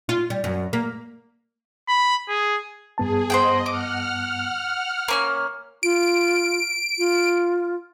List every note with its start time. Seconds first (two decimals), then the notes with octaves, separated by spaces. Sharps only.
0.09 F4
0.30 G3
0.44 F#2
0.73 A#3
1.88 B5
2.28 G#4
2.98 G2 B3 G#4 A5
3.30 C5 D#5 F#5 G5
3.66 F#5 D6 F6
5.08 A#3 C#4 A#5 F6
5.83 F4 D7
6.98 F4